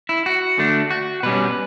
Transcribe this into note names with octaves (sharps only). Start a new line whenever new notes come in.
E4
F#4
D3 A3 D4
F#4
B2 G3 C#4 B4